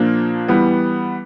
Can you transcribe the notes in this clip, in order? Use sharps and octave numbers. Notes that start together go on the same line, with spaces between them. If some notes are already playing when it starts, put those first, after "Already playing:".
Already playing: A#2 F3 A#3 D4
E3 G3 B3